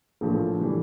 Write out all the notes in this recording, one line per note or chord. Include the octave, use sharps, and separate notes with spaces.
A#1 A2 F3
A2 E3 G3